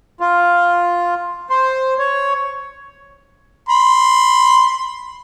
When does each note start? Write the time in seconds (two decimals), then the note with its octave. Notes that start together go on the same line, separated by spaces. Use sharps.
0.20 F4
1.50 C5
1.99 C#5
3.69 B5 C6